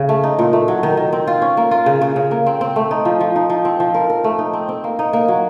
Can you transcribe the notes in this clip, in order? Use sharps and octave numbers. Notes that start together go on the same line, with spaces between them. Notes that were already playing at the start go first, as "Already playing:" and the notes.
Already playing: C#3
A3
D#4
A#2
A3
F#3
D#3
D#3
C4
F4
C#4
A#3
F4
C#3
C#3
C#3
A#3
C4
C4
A3
D#4
F3
F3
D#4
F3
C4
F3
A#4
A#4
A3
D#4
C4
C4
A#3
D#4
A#3
F#3